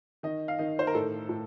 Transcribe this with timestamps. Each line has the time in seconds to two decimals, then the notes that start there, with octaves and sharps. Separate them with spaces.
0.23 D#3 D#5
0.48 F5
0.59 D#3 D#5
0.79 C5
0.87 A#4
0.94 A2 A4
1.29 A2